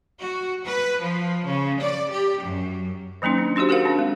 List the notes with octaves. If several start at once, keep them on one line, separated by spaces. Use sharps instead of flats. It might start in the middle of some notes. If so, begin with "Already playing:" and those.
F#4
B4
F3
C#3
D5
G4
F#2
D#3 F#3 A#3 C#4 D#4
D4
D4 D#4 F#4 G4 C5
F#4 G#4 A#4 C5 F5 F#5
C4 D4
G#3